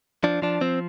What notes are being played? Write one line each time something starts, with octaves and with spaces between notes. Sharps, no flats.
F3 D4
F3 D4
F3 C4